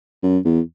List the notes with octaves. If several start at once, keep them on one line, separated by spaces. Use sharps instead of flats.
F#2
E2